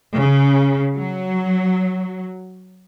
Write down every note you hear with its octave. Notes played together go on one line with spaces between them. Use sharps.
C#3
F#3